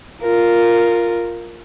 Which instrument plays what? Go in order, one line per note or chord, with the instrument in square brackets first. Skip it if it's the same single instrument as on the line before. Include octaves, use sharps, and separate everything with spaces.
[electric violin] F4 A#4